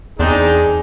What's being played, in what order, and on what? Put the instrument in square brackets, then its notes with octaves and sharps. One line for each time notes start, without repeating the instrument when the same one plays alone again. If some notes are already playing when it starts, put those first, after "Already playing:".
[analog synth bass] E2 [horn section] C4 D4 D#4 [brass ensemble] G#4